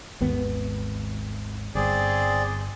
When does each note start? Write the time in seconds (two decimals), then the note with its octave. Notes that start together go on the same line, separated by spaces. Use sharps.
0.21 G#1 D#2 B3
1.75 G1 C4 G#4 D5